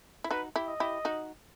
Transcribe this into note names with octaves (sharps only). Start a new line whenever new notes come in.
E4
D#4 F#4 B4
E4 G4
D#5
E4 G4
D#4 F#4